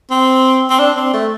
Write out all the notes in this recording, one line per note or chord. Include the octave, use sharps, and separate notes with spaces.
C4
C4
D4
C4
A3